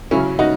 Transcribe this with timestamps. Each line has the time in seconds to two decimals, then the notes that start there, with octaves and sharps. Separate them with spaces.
0.11 C#3 F#3 C#4 E4
0.39 D#4 F#4